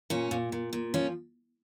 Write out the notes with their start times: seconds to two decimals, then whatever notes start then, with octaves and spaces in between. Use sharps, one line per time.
0.10 A#2 C#4
0.31 A#2
0.52 A#2
0.73 A#2
0.94 F3 C#4